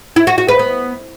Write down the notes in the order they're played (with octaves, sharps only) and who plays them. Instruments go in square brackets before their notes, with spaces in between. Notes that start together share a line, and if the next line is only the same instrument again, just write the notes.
[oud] E4
F#4
F#4
B4
B3